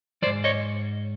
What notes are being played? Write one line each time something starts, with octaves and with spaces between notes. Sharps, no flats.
F3 C5 D5
G#2
C#5 D#5